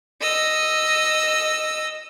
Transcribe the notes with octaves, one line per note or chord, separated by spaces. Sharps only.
D#5 E6